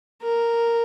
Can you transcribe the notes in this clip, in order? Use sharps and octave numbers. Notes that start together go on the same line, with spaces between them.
A#4